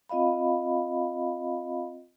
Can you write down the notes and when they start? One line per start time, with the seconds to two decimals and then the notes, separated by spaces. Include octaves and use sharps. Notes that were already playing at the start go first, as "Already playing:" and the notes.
0.09 C4 F4 D#5 F5 B5